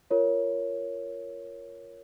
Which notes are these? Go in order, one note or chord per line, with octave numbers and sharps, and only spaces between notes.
F4 A#4 C#5